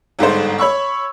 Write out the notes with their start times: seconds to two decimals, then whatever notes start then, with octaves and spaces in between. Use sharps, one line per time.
0.19 G1 G#2 A4 C5
0.58 C#5 B5 C#6 E6